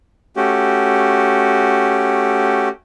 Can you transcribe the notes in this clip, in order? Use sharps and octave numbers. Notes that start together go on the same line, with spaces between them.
A3 C#4 F#4 G4